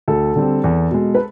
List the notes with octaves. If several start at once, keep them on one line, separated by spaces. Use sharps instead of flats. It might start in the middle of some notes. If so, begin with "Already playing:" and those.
D2 A4
D3 G3 C4
E2
B2 G#3
B4